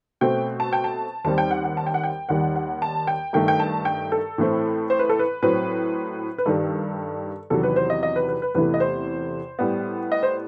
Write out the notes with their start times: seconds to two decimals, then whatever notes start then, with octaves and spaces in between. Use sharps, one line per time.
0.21 B2 A3 C4 G5
0.60 A5
0.73 G5
0.84 A5
1.24 D#2 D#3 G3 C4 A5
1.38 G5
1.51 F#5
1.64 F#5
1.77 A5
1.87 G5
1.94 F#5
2.03 G5
2.29 D#2 D#3 G3 F#5
2.56 F#5
2.82 A5
3.07 G5
3.33 G2 D#3 A3 G5
3.48 G5
3.60 A5
3.85 G5
4.12 A4
4.38 A2 E3 A3 C4
4.90 C5
4.99 B4
5.09 A4
5.19 B4
5.42 A2 F#3 C4 B4
6.38 B4
6.46 G2 D#3 G3 A4
7.50 E2 C3 D#3 F#3 A4
7.63 B4
7.76 C5
7.90 D#5
8.03 D#5
8.16 B4
8.29 B4
8.42 B4
8.55 E2 C3 E3 A3 B4
8.74 D#5
8.80 C5
9.59 A2 G3 B3
10.12 D#5
10.23 C5